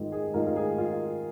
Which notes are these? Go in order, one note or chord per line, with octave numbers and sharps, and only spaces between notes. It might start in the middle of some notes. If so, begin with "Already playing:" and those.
Already playing: G#2 D#3 F4 G#4
G#4
G#2 D#3 F4 A#4
F4
G#4
F4